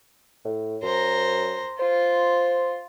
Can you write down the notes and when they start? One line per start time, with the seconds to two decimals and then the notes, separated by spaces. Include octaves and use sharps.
0.45 A2
0.83 F#2 C5 A#5
1.80 F4 C5